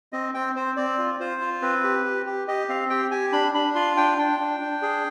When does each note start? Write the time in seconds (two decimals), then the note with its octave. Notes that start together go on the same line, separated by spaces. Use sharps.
0.13 C4 D#5
0.34 C4 G5
0.55 C4 C5
0.77 C4 D5
0.98 F4
1.20 F4 C5
1.41 F4
1.62 C4 B4
1.83 G4
2.05 G4
2.26 G4
2.48 G4 D#5
2.69 C4 F5
2.90 G4 G5
3.11 G4 G#5
3.32 D4 B5
3.54 D4 B5
3.75 F4 C6
3.97 D4 G5
4.18 D4 G5
4.40 D4
4.60 D4
4.82 G#4